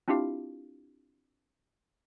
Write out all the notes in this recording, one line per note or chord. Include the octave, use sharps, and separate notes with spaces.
C4 D4 E4 F4 G4 F5